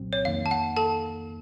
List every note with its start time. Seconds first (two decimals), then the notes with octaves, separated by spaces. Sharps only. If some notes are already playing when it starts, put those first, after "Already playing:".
Already playing: C2 A#2 F#3 C4
0.13 C#5
0.25 F2 D#3 A#3 F5
0.46 A5
0.51 F#5
0.77 A4 A5